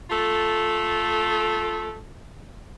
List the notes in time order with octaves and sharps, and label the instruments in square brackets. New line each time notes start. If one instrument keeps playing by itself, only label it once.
[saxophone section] A3 F4 A4